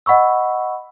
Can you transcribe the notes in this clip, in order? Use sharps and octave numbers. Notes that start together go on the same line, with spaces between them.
D#5 F#5 B5 C#6 E6